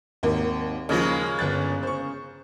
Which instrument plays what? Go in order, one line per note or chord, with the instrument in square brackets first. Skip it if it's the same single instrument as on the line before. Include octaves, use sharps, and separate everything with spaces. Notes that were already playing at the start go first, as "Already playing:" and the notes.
[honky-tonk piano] G#1 D#2 A#4
[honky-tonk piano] D#2 F3 [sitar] C#3 G#3 A#3
[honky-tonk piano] G1 F#6 A6
C5 C#6